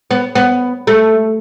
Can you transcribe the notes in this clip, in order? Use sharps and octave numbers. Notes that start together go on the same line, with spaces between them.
B3
B3
A3